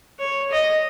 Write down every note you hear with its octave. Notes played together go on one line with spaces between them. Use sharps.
C#5
D#5